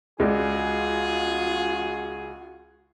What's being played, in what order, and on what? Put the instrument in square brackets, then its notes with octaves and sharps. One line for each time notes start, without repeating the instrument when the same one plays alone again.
[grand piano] C#2 G#3 D5 [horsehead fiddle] F4 F#4 [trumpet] G#4